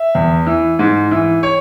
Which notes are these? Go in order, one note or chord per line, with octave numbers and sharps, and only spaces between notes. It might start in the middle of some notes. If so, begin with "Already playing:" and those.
Already playing: E5
E2
E3
G#2
E3
C#5